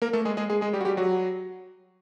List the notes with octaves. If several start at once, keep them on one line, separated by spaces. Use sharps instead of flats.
A#3 A#4
A3 A4
G#3 G#4
G#3 G#4
G#3 G#4
G#3 G#4
G3 G4
F#4
G3 G4
F#3 F#4